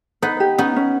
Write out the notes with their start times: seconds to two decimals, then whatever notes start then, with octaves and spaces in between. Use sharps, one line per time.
0.22 B3 D#4 B4
0.40 G4
0.58 B3 C#4 D#4
0.76 C#4